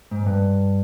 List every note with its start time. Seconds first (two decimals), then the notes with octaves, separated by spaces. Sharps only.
0.11 G#2
0.26 G2